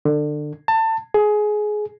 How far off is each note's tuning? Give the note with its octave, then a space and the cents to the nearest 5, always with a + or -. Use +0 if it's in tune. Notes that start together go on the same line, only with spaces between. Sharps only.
D3 +25
A5 +25
G#4 +20